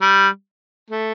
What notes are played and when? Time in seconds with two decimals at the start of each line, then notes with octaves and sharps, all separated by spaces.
0.01 G3
0.90 A3